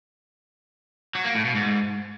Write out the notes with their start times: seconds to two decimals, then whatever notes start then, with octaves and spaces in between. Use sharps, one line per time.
1.15 F#3
1.25 A#3
1.35 A2
1.45 B2
1.55 G#2